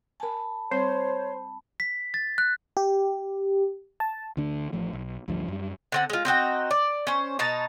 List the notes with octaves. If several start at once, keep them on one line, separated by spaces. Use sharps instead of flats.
A#4 G#5 A5 B5
G3 C4 C5 C#5 C6
B6
A6
F#6
G4
A5
D2 D3 D4
A1 F3 A3
B1
A1 D2 G2 F3
F#2 G3
D3 C4 F#5
G#3 F4
C4 D#4 F#4 G5
D5
C#4 C5
B2 D#4 A5 A#5